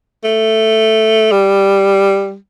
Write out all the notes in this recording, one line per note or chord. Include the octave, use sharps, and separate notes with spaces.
A3
G3